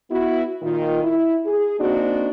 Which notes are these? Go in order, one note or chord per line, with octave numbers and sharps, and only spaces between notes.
B3 E4 F#4
A#2 D#3 F4
E4
G#4
A#3 C4 D4 D#4 F#4